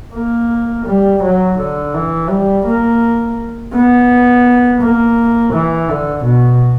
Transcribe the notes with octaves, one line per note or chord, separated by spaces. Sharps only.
A#3
G3
F#3
D3
E3
G3
A#3
B3
A#3
E3
D3
B2